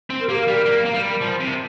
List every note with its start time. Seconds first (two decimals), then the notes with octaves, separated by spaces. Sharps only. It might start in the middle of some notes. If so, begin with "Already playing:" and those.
0.10 C4
0.20 A#4
0.29 A#3 G4
0.38 A#4
0.48 G3
0.66 A#3
0.85 A#3
0.94 G3
1.21 F3
1.40 C3